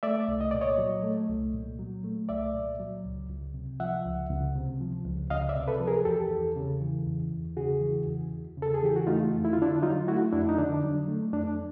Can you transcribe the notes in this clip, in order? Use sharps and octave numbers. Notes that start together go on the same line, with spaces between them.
A3 D5 E5
C2
D#5
A#2 D5
C#5 D#5
F#3
A3
C2
A#2
F#3
A3
C2 D5 E5
A#2
F#3
C#2
C#2
C3
F3 E5 F#5
C#2
C#2
C3
F3
C#2
C#2 D#5 F5
D5 E5
C3
A4 B4
F3
G#4 A#4
E2 G4 A4
E2
C#3
E3
E2
E2
C#3 F#4 G#4
E3
E2
E2
C#3
A4
G#4
E3 G4
F#4
A3 D#4 F4
F2
E4
F4
D3 D4 E4
F#3 D#4 F4
A3 E4 F#4
F2 D4 E4
D#4
D3 D4
F#3
A3
F2 D4